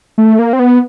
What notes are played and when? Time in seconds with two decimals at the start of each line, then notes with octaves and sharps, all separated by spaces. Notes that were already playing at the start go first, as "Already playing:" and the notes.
0.18 A3
0.39 A#3
0.53 C4
0.59 B3